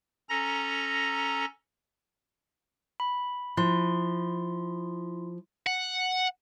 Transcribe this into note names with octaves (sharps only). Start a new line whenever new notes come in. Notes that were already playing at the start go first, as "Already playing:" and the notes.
C#4 A4 A#5 A#6
B5
F3 E4 C6
F#5